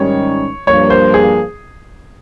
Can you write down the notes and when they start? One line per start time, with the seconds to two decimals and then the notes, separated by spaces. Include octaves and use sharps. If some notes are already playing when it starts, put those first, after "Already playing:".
Already playing: G#2 D#3 G3 C#4 C#5
0.67 G2 F3 A#3 C#5
0.90 C5
1.14 G#4